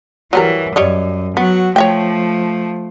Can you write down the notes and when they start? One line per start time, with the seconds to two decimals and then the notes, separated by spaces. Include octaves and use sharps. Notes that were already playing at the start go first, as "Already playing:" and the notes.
0.33 E3 F#3 G3 A#4
0.76 F#2 G3 C#5 D#5
1.37 F#3 B3 F#4
1.76 F3 A3 C#5 E5 G5